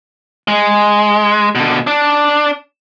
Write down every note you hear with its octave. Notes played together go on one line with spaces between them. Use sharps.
G#3
B2 D3
D4